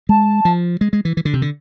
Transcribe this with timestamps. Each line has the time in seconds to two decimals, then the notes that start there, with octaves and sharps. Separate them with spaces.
0.09 G#3 A5
0.45 F3
0.81 G#3
0.93 G#3
1.05 E3
1.17 E3
1.25 D3
1.33 C3
1.42 D3